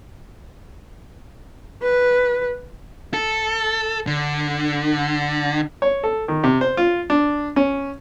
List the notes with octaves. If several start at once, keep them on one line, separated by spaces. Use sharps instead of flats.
B4
A4
D3
C#5
A4
D#3
C3
C5
F4
D4
C#4